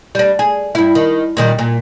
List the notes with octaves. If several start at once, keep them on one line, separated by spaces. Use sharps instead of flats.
G3 D4
G#4
G2 E4
D#3
A#2 D#3 G3
A#2